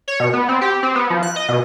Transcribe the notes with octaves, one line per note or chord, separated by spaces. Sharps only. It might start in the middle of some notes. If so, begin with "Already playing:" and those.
C#5
B2
B3
C4
G4
C4
B3
F3
F#6
D#5
B2